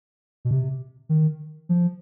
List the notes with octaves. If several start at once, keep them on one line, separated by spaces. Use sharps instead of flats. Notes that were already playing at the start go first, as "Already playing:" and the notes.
B2
C3
D#3
F3